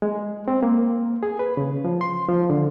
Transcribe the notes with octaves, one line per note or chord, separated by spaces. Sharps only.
G#3
C4
A#3
G#4
B4
C#3
F3
C6
F3
D3